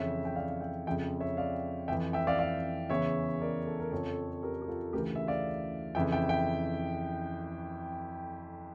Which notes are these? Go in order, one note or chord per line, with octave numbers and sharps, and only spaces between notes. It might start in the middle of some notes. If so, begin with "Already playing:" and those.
Already playing: F2 C#3 E3 C#5 E5
G5
D5 F5
F5
E5 G5
F2 C#3 F3 E5 G5
C#5 E5
D5 F5
F2 E3 E5 G5
E5 G5
D5 F5
D5 F5
E2 C#3 E3 C#5 E5
A#4 D5
A4
A#4
F2 C#3 F3 A4 C#5
G4 A#4
G4
F4 A4
D2 C#3 E3 G4 A#4
E5
D5 F5
F2 C#3 E3 E5 G5
E5 G5
E5 G5